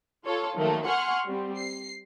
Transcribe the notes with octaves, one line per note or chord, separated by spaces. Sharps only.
F4 A4 C#5
D#3 F3 F#3 A3 A#3
F#5 G#5 C6 C#6 F6
G3 C4
C7